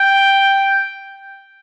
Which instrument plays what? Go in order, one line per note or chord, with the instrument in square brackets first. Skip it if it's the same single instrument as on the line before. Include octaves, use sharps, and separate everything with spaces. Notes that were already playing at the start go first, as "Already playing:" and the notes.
Already playing: [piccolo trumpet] G5